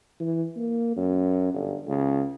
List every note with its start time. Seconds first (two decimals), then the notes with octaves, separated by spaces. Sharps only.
0.20 E3
0.56 A#3
0.97 F#2
1.54 G1
1.87 C#2